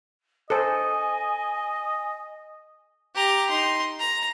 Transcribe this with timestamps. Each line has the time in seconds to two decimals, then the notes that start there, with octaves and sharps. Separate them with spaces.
0.50 A4 C5 D#5 G#5
3.15 G4 A#5
3.49 D#4 C6
3.99 A#5